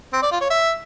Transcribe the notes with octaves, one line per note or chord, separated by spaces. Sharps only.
C4
D5
F4
C#5
E5